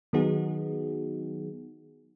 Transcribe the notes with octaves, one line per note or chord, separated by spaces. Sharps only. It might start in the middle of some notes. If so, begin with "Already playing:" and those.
D#3 F#3 B3 D#4 F#4 G#4